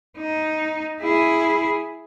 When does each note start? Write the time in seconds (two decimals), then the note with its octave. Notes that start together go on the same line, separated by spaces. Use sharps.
0.17 D#4
1.01 E4 G#4